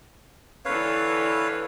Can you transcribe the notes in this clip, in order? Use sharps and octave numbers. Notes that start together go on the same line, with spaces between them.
D3 E3 B4 C#5 F5